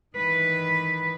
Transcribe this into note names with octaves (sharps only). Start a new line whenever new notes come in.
D#3 E3 B4